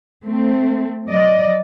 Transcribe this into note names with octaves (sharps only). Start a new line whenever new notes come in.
A3 C4
F#3 D5 D#5